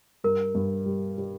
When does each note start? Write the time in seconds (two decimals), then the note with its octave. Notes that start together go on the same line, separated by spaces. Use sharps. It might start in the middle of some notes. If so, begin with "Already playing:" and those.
0.24 G2 A#4
0.55 G2
0.86 G3
1.17 G3